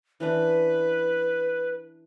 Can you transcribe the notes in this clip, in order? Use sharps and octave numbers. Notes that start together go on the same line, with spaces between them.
E3 C#4 D4 B4